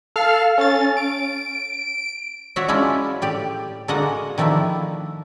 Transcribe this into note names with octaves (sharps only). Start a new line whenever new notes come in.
A4 F5 F6
C#4 A6
D7
F#4 C#5 D5 E5 F#5
G#3 C#4 D4 E4 F4
A2 G4 D5
D3 G#3 A#3 F#4 D#5 F#5
D#3 F3 A3 D4 E4